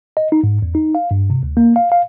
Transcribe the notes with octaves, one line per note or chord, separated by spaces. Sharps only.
D#5
D#4
G#2
E2
D#4
F5
G2
C3
D2
A#3
F5
F5